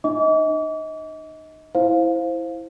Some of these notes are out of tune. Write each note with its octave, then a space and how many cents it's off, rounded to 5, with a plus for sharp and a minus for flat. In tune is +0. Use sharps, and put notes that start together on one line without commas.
D#4 -45 D#5 +30 D6 -40
E4 +0 C5 +0 F5 +0